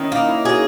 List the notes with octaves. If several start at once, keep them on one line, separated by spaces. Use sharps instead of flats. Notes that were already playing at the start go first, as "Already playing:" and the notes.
Already playing: D#3 C#4 E4
A#3 D#4
E4
F#4 G#4